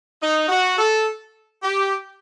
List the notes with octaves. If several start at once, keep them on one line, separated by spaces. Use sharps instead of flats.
D#4
F#4
A4
G4